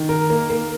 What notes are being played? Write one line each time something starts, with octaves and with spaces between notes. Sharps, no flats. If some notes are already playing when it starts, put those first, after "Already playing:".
Already playing: D#3
A#4
A#3
A#3